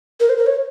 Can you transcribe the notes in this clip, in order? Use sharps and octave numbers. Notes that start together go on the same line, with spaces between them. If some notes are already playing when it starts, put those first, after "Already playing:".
A#4
C5
A#4
C#5